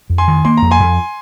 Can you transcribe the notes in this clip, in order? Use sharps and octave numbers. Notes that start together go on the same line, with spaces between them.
F2
G#5 C6
D#3
A#3 C6
F2 A#5
G#5 C6
F2